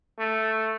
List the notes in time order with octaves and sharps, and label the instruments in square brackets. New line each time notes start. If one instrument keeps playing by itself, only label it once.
[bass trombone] A3